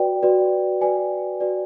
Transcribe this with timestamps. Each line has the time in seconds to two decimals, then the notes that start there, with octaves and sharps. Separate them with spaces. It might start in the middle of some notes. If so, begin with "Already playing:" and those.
Already playing: F#4 B4 D5 G5
0.23 F#4 B4 D5
0.81 F#4 B4 D5 G#5
1.40 F#4 B4 D5